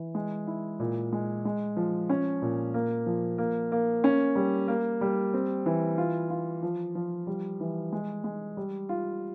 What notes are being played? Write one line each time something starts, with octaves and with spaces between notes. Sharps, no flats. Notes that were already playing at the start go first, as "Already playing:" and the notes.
Already playing: E3
G#3
E4
A#2
G#3
G#3
F3
C#4
A#2
A#3
F3
A#3
A#3
C#4
G3
A#3
G3
C4
E3
F4
F4
F3
F3
G3
E3
G#3
G#3
G3
F4